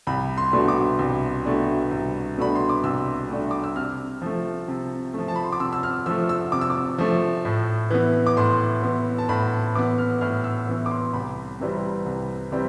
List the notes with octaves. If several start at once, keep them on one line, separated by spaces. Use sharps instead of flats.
C2 B5
C6
B2 A3 D4
D6
C2
B2 A3 D4
C2
B2 A3 D4 B5
C6
D6
C2 E6
B2 A3 D4
D6
E6
C3 F6
F3 A3
C3
F3 A3
A5
B5
C6
D6
C3 E6
E6
F6
F3 A3 E6
E6
C3 D6
E6
D6
F3 A3
A2
E3 B3
D6
A2 C6
E3 B3
A5
A2 B5
E3 B3 D6
F6
A2 F6
E6
E3 B3
D6
C6
C2 B5
C3 E3 G3 C4
C2
C3 E3 G3 C4